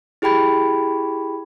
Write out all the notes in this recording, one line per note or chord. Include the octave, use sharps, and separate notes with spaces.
E4 G4 G#4 G5 B5 G#6